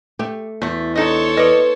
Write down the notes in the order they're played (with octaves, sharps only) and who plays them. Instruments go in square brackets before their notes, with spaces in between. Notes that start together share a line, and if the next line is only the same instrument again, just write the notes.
[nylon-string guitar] A3 [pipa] G4
[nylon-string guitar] E2 [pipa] A3 F#4
[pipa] D3 D#4 D#5 [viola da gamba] A4 C5 C#5
[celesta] B4 [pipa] D5 D#5